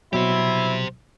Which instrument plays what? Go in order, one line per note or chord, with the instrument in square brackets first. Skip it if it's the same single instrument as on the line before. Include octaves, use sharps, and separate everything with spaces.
[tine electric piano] B2 F#3 [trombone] E4 [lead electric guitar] G4 C5